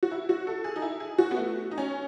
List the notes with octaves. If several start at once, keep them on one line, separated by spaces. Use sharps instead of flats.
F#4
E4
F#4
A4
G#4
D#4
E4
G#4
F#4
B3
A3
D#4
C#4